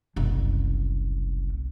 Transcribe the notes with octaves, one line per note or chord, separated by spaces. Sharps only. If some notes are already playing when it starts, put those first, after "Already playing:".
F#1 C2